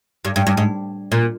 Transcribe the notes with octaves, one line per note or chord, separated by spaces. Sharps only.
G2
G2
G2
G#2
A#2